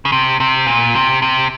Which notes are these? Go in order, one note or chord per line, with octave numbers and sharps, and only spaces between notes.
C#3
C3
C3
A#2
C3
C3